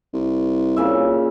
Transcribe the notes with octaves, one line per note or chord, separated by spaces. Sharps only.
C2
A#2 C#3 E5